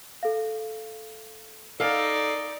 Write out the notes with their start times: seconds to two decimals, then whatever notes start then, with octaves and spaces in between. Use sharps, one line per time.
0.23 A4 F5
1.80 D#4 A4 D5 F5 G#5